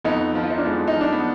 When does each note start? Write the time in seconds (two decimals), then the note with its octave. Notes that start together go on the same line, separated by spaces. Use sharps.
0.04 F2 B3 D#4
0.35 F3
0.43 F4
0.50 D#4
0.58 D4
0.65 F2 G#3 B3
0.87 D#4
0.95 F3
1.01 D4
1.12 B3